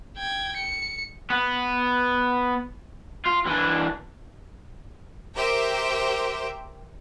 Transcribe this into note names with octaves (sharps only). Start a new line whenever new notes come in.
G5 G#6
C#7
B3
F4
E3 D4
G4 A#4 C5 E5 G5